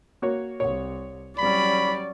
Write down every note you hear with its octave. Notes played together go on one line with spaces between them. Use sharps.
A#3 F#4 C#5
C2 C#5
F#3 G3 C#4 D5 B5